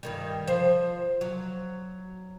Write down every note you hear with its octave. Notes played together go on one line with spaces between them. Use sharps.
G2 D#3 G3
F3 C5
F#3